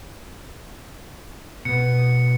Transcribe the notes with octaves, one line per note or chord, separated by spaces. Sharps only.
B2 B3 C#7